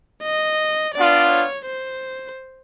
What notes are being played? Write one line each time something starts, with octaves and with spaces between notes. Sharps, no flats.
D#5
B3 D4 F4 D5
C#5
C5